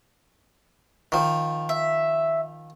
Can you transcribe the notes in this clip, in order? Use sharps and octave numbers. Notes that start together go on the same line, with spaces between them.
D#3 F3
E5